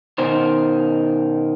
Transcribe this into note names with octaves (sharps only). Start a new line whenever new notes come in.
B2 D#3 D#4 C5